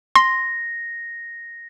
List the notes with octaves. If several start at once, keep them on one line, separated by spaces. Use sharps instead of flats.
C6 A#6